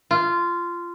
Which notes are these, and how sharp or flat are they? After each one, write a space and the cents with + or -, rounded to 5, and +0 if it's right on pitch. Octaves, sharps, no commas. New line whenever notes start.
F4 -15